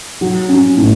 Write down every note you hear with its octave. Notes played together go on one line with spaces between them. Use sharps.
F#3
C#4
A2